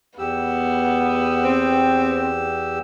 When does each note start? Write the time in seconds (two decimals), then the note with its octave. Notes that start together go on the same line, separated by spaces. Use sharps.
0.18 E2 B3 G4 E6
1.44 C4